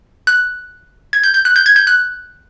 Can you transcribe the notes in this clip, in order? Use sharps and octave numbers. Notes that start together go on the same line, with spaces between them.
F#6
G#6
G6
G6
F#6
G6
G#6
G6
F#6